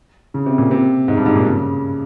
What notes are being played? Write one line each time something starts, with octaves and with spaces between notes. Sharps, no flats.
C#3
C3
A#2
C3
G#2
G2
G#2
A#2
C#3